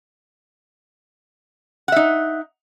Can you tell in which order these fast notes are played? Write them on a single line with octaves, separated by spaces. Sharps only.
F#5 E5 D#4